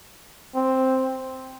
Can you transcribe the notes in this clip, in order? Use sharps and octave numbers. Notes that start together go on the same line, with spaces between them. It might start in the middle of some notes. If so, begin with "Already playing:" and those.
C4